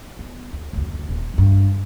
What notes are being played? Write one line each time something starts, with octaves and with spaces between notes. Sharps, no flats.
B3
D#2
F#1 D2
D#1
E2 G2